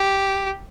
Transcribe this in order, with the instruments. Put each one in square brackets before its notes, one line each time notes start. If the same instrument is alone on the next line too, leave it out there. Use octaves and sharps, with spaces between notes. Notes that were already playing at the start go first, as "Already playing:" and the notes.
Already playing: [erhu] G4